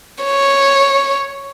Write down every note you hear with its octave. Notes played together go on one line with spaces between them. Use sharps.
C#5